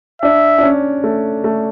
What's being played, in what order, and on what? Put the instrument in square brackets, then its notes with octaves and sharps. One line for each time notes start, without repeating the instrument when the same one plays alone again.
[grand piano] D4 [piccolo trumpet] E5
[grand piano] D4
C#4
A3
A3